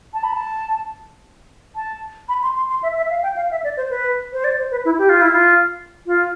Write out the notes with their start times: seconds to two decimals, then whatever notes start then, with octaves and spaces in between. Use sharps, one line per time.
0.14 A5
0.24 B5
0.33 A5
1.76 A5
2.29 B5
2.43 C6
2.56 C6
2.70 C6
2.83 E5
2.97 E5
3.10 F5
3.23 G5
3.36 F5
3.51 E5
3.64 D5
3.77 C5
3.90 B4
4.33 C5
4.44 D5
4.58 C5
4.71 B4
4.85 E4
4.98 G4
5.09 F4
5.21 E4
5.32 F4
6.07 F4